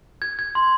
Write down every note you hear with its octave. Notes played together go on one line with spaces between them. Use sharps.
G#6
G#6
C6